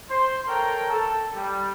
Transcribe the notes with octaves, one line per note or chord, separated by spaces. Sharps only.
C5 C6
A4 A#4 C#5 G5 A#5
A4
G3